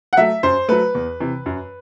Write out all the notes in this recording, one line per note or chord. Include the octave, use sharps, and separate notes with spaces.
F#5
F#3 A3 E5
F#2 C5
F#3 A3 B4
E2
C3 E3
F#2